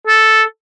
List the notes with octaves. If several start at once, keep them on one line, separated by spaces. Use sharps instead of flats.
A4